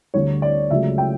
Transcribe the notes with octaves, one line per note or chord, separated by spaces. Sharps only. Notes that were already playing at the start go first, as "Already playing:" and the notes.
D2 D3 G3 C#5
D5
C#2 C#3 F#3 A3 E5
G5